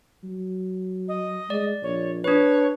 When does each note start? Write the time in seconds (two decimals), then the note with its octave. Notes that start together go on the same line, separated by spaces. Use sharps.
0.24 F#3
1.08 D#5
1.50 G#3 D5
1.83 A#1 C#5
2.24 D4 B4 C#5